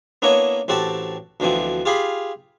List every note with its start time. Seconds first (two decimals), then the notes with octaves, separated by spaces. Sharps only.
0.22 A#3 B3 D4 E4 C#5 D#5
0.68 A1 C4 F#4 G4 A4 A5
1.40 D2 B2 D3 E3 F3 C4
1.85 F4 G4 G#4 F5 B5